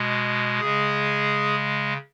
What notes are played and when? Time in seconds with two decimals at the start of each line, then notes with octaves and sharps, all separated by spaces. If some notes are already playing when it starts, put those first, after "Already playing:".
Already playing: B2 G#3
0.60 C#3 G#3 G#4